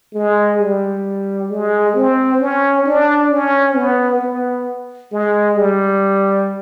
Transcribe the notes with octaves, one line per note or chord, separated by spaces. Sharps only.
G#3
G3
G#3
C4
C#4
D4
C#4
B3
B3
G#3
G3